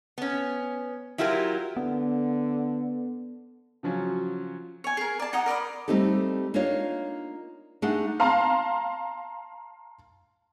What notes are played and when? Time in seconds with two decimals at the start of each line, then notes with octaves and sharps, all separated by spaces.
0.18 B3 C#4
1.18 F#3 E4 F4 G4 A4 A#4
1.77 D3 B3
3.83 C#3 F3 F#3 C#4
4.84 C#5 G#5
4.97 G#4 A#4
5.19 D5 A5
5.33 D#4 F#5 A#5 D#6
5.46 A#4 D5 B5 D#6
5.88 G3 A3 C4 D#4 G4 A4
6.54 A#3 D4 D#4 F4 C#5
7.82 A3 D4 D#4 G#4 F#5
8.20 F5 A5 A#5 C6